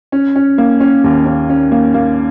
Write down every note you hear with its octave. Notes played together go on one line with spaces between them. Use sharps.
C#4
C#4
A#3
C#4
D#2
C#4
C#4
A#3
A#3